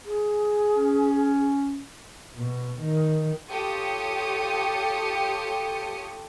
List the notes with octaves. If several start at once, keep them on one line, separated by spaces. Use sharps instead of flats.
G#4
C#4
B2
D#3
F4 G4 A4 C#5 D#6 C#7